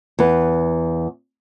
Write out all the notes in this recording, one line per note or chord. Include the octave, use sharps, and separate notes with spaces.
E2 B4